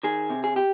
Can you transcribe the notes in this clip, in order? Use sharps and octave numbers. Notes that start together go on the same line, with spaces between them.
D#3 G#4
C3
G#4
G4